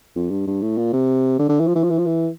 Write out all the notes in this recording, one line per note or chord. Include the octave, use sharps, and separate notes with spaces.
F2
G2
G2
A2
A#2
C3
D3
D3
E3
F3
E3
F3
E3
F3
E3